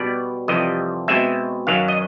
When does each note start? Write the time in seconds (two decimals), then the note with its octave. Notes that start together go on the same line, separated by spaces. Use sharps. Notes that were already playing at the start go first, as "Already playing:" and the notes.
Already playing: B2 G3 B3 D5
0.48 F2 C3 E3 G3 D#5
1.08 B2 G#3 C4 E5
1.67 F#2 D#3 F#3 F5
1.88 D#5